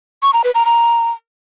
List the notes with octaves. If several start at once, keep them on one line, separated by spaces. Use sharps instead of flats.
C#6
A#5
B4
A#5
A#5